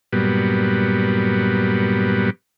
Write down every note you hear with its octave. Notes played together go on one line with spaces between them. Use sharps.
G2 A#2 F#3 G3 B3